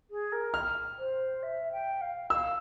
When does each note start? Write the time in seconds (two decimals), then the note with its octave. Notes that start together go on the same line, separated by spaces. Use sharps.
0.10 G#4
0.32 A#4
0.54 F6
0.98 C5
1.42 E5
1.72 G5
2.01 F5
2.30 F5 E6